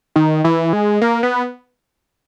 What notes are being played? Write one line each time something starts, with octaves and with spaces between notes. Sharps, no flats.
D#3
E3
G#3
A#3
B3